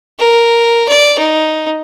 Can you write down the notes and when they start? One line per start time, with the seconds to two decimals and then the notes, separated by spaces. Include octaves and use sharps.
0.19 A#4
0.89 D5
1.19 D#4